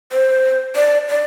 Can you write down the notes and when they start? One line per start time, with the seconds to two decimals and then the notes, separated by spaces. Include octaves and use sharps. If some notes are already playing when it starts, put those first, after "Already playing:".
0.12 C5
0.76 D5
1.08 D5